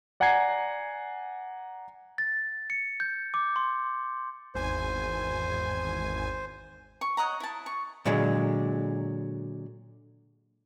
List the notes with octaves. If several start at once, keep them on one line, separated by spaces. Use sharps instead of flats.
D5 F#5 G#5 A#5 G#6 C7
A6
C#7
G6
D6
C6
G#1 E2 C5 G#5
C#6
C#5 D#5 F#5 A#5
E4 A5
C#6
A#2 D3 F#3 G#3